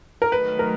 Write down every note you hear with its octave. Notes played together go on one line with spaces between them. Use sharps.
A#4
D#3 F#3 A3 B4
A#4